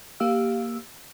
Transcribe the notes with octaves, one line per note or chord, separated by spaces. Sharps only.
A#3 G4 F5 E6